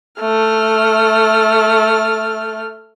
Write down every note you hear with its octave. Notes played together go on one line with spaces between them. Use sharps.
A3 F6